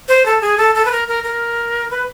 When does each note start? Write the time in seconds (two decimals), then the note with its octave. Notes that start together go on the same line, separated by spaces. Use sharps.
0.08 C5
0.26 A4
0.41 G#4
0.58 A4
0.75 A4
0.85 B4
0.92 A#4
1.08 A#4
1.24 A#4
1.91 B4